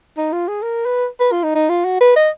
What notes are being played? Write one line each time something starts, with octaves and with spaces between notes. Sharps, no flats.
D#4
F4
G#4
A#4
B4
B4
F4
D#4
D#4
F4
F#4
B4
D#5